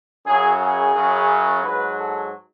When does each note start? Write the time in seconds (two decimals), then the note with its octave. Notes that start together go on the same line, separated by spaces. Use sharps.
0.25 F#2 C#3 F#3 G#4
0.59 G#4
0.94 F#2 C#3 F#3
1.63 G#2 F#3 B4
1.98 A4